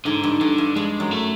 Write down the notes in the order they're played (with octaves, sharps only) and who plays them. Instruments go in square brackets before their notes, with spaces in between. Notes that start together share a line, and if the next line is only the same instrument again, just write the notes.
[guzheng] G#2 [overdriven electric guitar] D3
[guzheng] G2
[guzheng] G2 [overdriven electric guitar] D3
[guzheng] G2
[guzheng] G2 [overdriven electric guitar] G#3
[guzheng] F#2
[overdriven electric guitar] A3